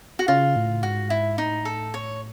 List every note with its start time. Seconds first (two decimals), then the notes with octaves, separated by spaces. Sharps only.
0.19 F#4
0.28 C#3 F4
0.56 A2
0.83 G#2 F#4
1.10 E4
1.38 A2 D#4
1.65 A4
1.94 C#5